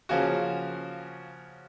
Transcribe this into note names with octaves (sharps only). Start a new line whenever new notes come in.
C#3 F3 A#3 C#4 F#4